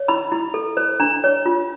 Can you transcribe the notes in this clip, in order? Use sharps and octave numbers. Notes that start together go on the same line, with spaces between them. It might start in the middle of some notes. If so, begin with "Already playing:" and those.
Already playing: C#5
E4 B5
E4
A4
C5
D4 A#5
C#5
F4